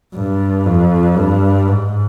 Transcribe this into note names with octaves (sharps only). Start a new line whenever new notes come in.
G2
F2
G2
G#2